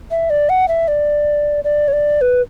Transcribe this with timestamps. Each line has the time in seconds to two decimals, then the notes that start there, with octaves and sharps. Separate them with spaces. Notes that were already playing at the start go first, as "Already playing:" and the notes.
0.11 E5
0.30 D5
0.49 F#5
0.68 E5
0.88 D5
1.64 D5
1.88 C#5
1.93 D5
2.21 B4